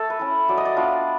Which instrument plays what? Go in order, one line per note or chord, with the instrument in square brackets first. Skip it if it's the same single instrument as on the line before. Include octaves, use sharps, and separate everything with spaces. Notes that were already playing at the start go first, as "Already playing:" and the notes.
Already playing: [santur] A3 A4
B4
C#4 E4
F#3 D5
D#5
D5
B3 D4 F4